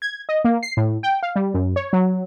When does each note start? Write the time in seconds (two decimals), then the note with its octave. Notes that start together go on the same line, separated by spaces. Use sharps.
0.02 G#6
0.29 D#5
0.45 A#3
0.63 C7
0.77 A2
1.03 G5
1.23 F5
1.36 G3
1.54 F#2
1.76 C#5
1.93 F#3